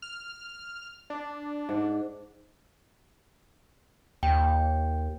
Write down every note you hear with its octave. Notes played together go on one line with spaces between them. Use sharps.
F6
D4
G#2
D#2 G5